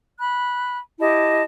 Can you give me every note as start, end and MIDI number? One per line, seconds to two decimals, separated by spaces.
0.19 0.78 83
0.19 0.78 90
1.00 1.42 64
1.00 1.42 67
1.00 1.42 75
1.00 1.42 81